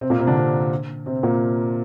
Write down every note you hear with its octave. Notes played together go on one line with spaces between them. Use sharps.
C3 C4
A#2 A#3
C3 C4
D3 D4
C3 C4
C3 C4
A#2 A#3